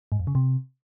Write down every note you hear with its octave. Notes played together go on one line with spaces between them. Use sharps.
G#2
F2
C#3
C3